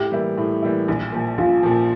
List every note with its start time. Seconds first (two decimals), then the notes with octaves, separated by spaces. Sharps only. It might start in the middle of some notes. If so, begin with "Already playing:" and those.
Already playing: A2 G4
0.12 E3 G3 A#3 E4
0.38 A2
0.62 E3 G3 A#3 E4
0.88 A#1
1.12 A#2 F3
1.38 A#1 F4
1.63 A#2 F3